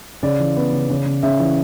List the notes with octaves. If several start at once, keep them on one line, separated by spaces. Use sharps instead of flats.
C#3 D5
E3
B3
C#3
C#3
C#3
C#3 E5
E3